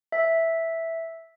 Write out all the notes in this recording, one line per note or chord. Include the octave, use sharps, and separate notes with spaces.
E5